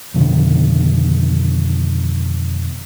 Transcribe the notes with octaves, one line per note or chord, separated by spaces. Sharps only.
F2 B2 D3 D#3